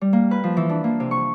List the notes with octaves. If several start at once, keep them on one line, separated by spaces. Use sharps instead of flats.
G3
A#3
B4
F3
E3
D4
A#3
C3
C#6